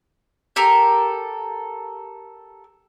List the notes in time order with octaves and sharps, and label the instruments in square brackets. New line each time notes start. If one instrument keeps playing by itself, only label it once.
[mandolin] G4 A4 A#4